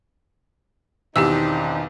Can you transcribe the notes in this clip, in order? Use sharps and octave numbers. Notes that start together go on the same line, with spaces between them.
B1 E2 D#3 C4 D4 D#4 G4 E6